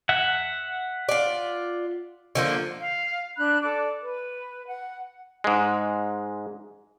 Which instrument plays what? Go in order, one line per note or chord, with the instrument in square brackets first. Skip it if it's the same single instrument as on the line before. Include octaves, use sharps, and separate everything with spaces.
[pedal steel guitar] E5 F#5
[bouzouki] F4 D5
D3 F3 A#3
[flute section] F5
D4 B5 F#6
A4 D5 D6
B4
F#5
[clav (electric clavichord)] G#2 G#3